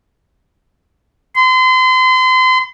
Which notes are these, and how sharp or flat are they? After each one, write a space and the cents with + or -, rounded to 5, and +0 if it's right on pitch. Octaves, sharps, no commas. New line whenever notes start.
C6 -35